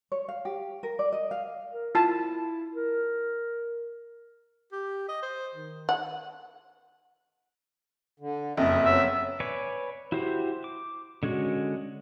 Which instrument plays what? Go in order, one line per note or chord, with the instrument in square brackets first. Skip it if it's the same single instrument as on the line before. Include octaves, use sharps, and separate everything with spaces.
[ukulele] C#5
F5
G4
A#4
D5
D#5
F5
[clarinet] A#4
[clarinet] E4 [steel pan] F4 A5
[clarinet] A#4
[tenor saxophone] G4
D#5
C5
D#3
[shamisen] F#5
[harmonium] D3
[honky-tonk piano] F#1 F2 [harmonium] D#5 E5
[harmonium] F#3 B3 [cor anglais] E5
[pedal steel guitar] B4 C#5 D5 G#5
E4 F#4 G4 C5
D6
D3 G#3 C#4 F#4